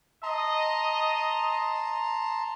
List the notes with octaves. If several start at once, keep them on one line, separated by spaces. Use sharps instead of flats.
D#5 A5 A#5 C6